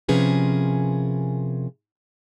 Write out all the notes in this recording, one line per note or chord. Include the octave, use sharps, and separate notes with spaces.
C3 F3 C#4 G#4 A#4 B4